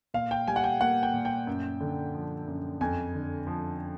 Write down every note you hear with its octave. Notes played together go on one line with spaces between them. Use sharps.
A#2 F5
G5
G3 G#5
F#5
G5
A#3 F#5
G5
A#2
G5
F#2
D3
F3
F#2
F2 G#5
D3
F3